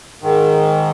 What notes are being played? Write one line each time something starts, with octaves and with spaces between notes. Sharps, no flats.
G#2 D#3